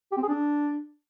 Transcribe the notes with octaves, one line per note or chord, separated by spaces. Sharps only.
G4
C4
G#4
D4